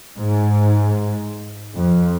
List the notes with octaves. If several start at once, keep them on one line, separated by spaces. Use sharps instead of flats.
G#2
F2